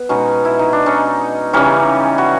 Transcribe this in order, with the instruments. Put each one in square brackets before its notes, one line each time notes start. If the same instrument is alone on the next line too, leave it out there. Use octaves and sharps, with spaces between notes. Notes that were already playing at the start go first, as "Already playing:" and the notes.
Already playing: [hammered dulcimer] B3
B2 G#3 C#4 D#4
E4
D#4
D4
C#4 D#4
C#3 E3 G3 C#4 D#4
F#4